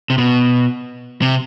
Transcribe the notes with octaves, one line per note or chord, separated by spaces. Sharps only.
C3
B2
C3